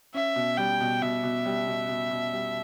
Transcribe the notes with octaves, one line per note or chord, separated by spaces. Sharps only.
C#4 E5
B2
G3 G5
B2
B2 E5
B2
G3
B2
B2
B2
G3